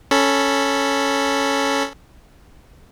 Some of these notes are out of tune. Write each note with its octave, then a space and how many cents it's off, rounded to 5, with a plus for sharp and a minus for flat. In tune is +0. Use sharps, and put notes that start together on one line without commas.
C#4 +0 A4 +0 B5 +0